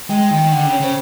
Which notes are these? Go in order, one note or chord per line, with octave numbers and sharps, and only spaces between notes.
G#3 G5
D#3 G5
D3 F#5
C#3 G5
C#5
C#3 C5